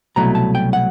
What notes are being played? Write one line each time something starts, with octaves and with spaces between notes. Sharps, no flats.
C2 B2 F#3 A3 A#5
A5
G5
F#5